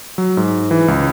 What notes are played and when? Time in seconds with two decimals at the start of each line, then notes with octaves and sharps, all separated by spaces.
0.18 F#3
0.37 G#2
0.71 E3
0.88 C#2